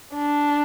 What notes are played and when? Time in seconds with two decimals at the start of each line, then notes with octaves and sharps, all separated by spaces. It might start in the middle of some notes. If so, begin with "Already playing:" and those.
0.15 D4